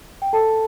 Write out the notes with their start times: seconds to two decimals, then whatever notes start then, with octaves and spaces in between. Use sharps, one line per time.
0.22 G5
0.33 A4 A5